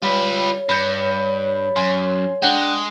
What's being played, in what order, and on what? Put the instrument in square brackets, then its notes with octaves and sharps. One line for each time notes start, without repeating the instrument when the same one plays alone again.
[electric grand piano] G3 [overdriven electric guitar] F4 B4 [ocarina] C#5
[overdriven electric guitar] G2 [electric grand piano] B5 G6 C#7
[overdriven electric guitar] F#2 [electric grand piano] G#5 C6
[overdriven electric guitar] G#3 [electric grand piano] D4 F#5 G5